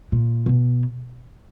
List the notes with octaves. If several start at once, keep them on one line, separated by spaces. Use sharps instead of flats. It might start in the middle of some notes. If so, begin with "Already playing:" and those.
A#2
B2